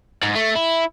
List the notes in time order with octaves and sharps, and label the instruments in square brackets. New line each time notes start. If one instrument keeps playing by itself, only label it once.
[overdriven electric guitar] G#2
A3
E4